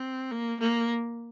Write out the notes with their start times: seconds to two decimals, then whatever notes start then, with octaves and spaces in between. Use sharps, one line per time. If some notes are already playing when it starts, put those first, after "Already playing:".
Already playing: C4
0.31 A#3
0.60 A#3